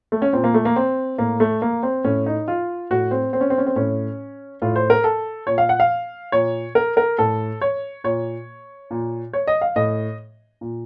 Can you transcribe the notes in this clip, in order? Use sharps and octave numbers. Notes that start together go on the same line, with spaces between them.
A3
C#4
A#2 C4
A#3
A3
A#3
C4
A2 A#3
A3
A#3
C4
A2 C#4
D#4
F4
A2 F#4
C4
C4
C#4
C4
C#4
C4
A2 C#4
A2 F4
C5
A#4
A4
A#2 C#5
F5
F#5
F5
A#2 C#5
A#4
A#4
A2 A4
C#5
A#2 C#5
A#2
C#5
D#5
F5
A2 D#5
A#2